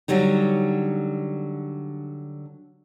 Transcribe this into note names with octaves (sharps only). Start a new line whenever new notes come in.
D3 F#3 G3 D#4